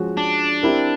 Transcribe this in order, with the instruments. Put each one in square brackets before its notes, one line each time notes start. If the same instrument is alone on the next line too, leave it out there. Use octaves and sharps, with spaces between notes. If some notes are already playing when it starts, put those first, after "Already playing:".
Already playing: [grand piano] F3 G#3 C#4 F#4
[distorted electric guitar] D4
[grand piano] C4 E4 G4 A#4